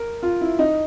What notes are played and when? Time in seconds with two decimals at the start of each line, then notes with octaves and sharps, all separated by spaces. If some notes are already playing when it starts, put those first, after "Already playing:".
Already playing: A#4
0.23 F4
0.41 E4
0.59 D#4